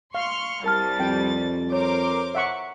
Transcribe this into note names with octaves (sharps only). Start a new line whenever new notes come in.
F5 C6 C#6 F6
C2 G3 A#4 A5 F6 A6
F2 G5
A#4 C5 C#5 D6
E5 F#5 C#6